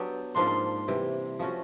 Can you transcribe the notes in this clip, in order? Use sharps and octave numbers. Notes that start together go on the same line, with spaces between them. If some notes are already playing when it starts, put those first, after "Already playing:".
Already playing: F#3 B3 D4 G4
G#2 F3 A#3 D4 C6
C3 E3 G3
F3 A3 C#4 F#4